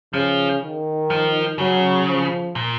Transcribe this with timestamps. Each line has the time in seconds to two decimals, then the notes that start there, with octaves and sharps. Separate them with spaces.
0.14 C#3 F3
0.63 D#3
1.10 F3
1.59 C#3 F#3
2.08 F3
2.55 A#2